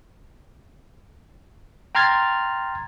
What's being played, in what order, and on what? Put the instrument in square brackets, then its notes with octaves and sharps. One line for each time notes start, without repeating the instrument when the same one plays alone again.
[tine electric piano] G5 A#5 C6 F6 G#6 A6